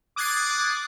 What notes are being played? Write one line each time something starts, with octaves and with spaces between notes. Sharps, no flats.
D6 D#6 F#6 G#6 A6 C7